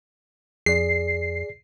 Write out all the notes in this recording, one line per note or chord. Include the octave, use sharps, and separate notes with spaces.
F2 G#4 D5 C7